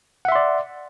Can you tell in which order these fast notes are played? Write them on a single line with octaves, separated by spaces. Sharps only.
F#5 E5 C6 D5